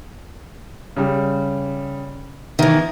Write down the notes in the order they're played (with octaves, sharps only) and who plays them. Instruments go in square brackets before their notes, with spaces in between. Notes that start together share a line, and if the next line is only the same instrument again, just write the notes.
[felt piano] C#3 G3
[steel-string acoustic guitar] D#3 E3 [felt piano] E5